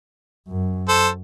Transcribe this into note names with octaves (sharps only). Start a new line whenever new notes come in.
F#2
A4 C5